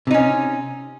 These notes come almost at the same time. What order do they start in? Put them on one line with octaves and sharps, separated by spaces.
C3 D#4 C#4